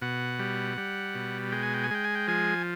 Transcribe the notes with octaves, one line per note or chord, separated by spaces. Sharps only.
B2 F#5
G3
G3
B2
G#3 G5
G#5
G5
G#5
G#3 G5
G#5
G5
F3 G#5